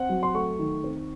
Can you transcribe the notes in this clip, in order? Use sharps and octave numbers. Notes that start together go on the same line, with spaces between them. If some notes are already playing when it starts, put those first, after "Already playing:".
Already playing: C4 F#5
F#3
C6
A3 C#6
D#3
C4